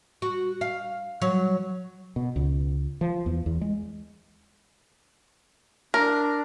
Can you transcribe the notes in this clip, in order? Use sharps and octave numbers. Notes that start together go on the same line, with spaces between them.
F#4
F5
F#3
B2
C#2
F3
E2
E2
G#3
D4 A#4